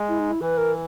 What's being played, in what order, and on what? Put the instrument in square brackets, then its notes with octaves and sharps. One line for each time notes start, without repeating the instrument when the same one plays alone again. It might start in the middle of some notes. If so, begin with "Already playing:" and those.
Already playing: [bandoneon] G#3
[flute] E4
D#4
E4
[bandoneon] E3 [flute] B4
[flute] A#4